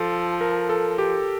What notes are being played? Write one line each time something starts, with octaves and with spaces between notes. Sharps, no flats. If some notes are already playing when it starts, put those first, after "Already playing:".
Already playing: F3 A4
A#4
A4
G4